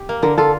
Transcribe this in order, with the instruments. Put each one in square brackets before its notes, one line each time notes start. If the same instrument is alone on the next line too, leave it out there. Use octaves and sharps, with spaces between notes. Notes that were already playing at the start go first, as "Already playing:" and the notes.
Already playing: [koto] G4
A#3
[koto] D3 [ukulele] A#4
[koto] F4 [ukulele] A4